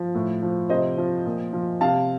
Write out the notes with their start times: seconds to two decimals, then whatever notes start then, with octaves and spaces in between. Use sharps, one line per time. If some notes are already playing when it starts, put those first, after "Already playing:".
Already playing: F3
0.15 A2
0.42 F3
0.69 C3 C5 D#5
0.98 F3
1.25 A#2
1.53 F3
1.81 C3 F5 A5